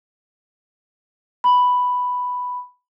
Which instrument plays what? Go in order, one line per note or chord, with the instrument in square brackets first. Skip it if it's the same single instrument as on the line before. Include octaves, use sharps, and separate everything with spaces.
[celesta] B5